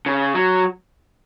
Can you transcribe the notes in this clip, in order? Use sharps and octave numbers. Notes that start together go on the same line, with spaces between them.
C#3
F#3